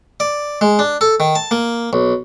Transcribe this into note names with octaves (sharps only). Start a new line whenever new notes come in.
D5
G#3
D4
A4
D#3
A5
A#3
B1